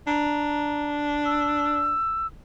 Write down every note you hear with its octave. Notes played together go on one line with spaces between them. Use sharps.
D4 A#5
E6